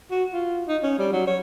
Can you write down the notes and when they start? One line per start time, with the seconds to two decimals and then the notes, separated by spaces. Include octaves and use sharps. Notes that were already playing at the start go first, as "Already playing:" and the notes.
0.11 F#4
0.33 F4
0.68 D#4
0.83 C#4
0.98 G3
1.12 F#3
1.27 C#5